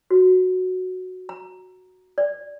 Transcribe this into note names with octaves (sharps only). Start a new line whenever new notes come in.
F#4
A#5
D5